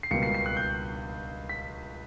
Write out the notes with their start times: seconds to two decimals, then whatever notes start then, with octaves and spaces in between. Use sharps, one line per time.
0.03 C7
0.11 C#2 B2 G3 A#3 C#7
0.23 C7
0.34 C7
0.46 F#6
0.57 G6
1.49 B6